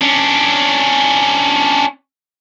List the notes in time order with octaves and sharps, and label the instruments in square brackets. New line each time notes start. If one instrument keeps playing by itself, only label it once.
[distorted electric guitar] C#4 D4